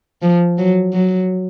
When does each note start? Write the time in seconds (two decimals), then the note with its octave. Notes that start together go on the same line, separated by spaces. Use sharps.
0.22 F3
0.58 F#3
0.93 F#3